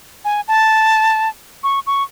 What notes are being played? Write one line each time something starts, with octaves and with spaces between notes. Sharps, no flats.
G#5
A5
C#6
C#6